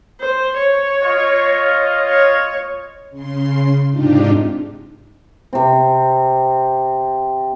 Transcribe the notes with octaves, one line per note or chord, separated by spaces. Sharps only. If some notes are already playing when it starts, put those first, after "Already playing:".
C5
C#5
F4 D#5
C#5
C#3 C6
G#2 C3 D4 D#4 F4 G4
C3 C4